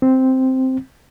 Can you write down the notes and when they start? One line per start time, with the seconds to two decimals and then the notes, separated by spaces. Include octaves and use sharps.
0.02 C4